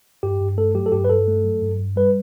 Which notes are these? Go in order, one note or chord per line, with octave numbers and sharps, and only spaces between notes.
G2 G4
G2
A3 A4
F#3 G4
A4
G2 G4
B4
G2 A4
A3
F#3
G2
G2
G3 B4